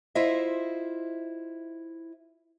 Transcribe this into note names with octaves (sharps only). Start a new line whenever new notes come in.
E4 F4 C5 D#5 E5